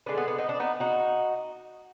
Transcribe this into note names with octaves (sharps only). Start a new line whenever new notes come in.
D3 G#3 B3 D4
B3
B3
B3 D#4
D4
B3 D#4
D#4 F#4